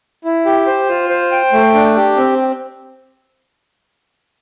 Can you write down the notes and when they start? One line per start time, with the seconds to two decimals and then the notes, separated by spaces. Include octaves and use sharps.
0.25 E4
0.46 G4
0.67 C5
0.89 F4
1.09 C5
1.32 G5
1.53 A3
1.74 D4
1.96 G4
2.17 C4